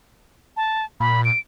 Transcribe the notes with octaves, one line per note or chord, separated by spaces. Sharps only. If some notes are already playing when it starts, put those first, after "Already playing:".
A5
A#2 B5
D7